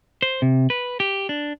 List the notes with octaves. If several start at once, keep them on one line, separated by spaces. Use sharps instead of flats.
C5
C3
B4
G4
D4